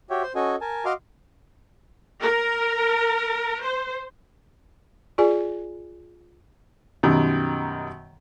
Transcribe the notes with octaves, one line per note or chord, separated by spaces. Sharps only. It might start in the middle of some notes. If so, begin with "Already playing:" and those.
F#4 G4 C#5 E5 G5
C5 C6
C#4 F#4 A4 D#5 G#5
A#4 G#5 A5
F#4 D#5 F5 C6 D6 F6
A#4
C5
F4 G#4 D5 G#5
F#2 B2 D#3 F#3 G3